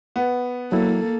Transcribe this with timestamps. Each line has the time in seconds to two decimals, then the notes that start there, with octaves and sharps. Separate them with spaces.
0.16 B3
0.72 F#3 A#3 E4 A4